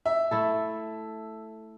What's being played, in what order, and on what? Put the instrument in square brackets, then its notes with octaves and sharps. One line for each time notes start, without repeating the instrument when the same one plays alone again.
[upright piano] E5
[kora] A3 E4 A4